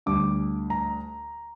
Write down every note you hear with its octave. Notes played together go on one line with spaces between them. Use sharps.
D2 D3 G3 D6
A#5